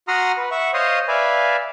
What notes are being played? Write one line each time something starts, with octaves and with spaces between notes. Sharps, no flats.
F#4 F#5 A#5 C6 D#6 F6
B4
E5 F#5 C#6
C5 C#5 D#5 F5 C6 D#6
B4 D5 E5 F5 G#5